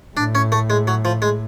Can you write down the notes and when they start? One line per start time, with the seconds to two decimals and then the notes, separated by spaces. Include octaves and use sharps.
0.17 A2 D4
0.35 C#4
0.52 A3
0.70 G#3
0.87 F#3
1.05 F3
1.22 G#3